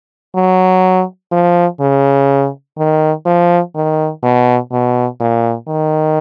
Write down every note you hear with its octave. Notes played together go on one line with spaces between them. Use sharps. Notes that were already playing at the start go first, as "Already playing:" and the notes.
F#3
F3
C#3
D#3
F3
D#3
B2
B2
A#2
D#3